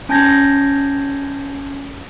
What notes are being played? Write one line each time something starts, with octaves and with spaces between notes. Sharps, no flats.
C#4 G#5 A5 G6 G#6 A#6